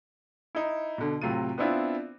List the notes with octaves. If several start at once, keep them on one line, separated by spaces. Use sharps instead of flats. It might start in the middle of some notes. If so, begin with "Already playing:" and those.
D#4 E4
B2 D3
A2 C3 F#3 F4 D#7
B3 C4 D4 E4 F4